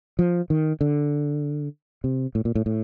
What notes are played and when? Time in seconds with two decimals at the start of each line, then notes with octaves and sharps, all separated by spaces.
0.19 F3
0.50 D#3
0.81 D3
2.04 C3
2.35 A2
2.45 A#2
2.55 A2
2.66 A2